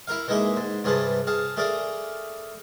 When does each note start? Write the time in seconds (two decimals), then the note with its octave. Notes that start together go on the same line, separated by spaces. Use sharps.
0.07 E4 A#4 F5
0.28 E3 G#3 A#3 D#4 G#4 E5
0.57 G#2
0.84 G2 C3 F4 G#4 B4 A5
1.27 G#4 F5 A5
1.57 A3 G#4 A#4 D5 F5